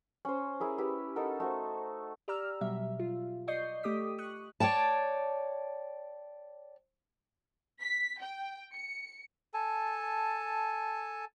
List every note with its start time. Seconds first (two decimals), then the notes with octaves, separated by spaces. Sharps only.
0.25 C#4 C5
0.60 E4 G#4 A#4
0.78 E4 G4 B4
1.16 D#4 A4 A#4 F#5
1.40 A3 F#4 C5
2.28 G4 D5 A#5 E6 F6
2.61 B2 F#3 G3 E5
2.99 F4
3.48 D5 D#5 C#6 D#6 G6 C7
3.83 A3 G4 D6 D#6 B6
4.18 C#6 D#6 F#6
4.60 C#5 D5 G5 A5
7.83 B6
8.20 G5
8.73 C#7
9.54 A4 G#5 A5